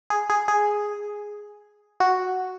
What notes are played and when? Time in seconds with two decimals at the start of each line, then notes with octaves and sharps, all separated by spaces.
0.10 G#4
0.30 G#4
0.48 G#4
2.00 F#4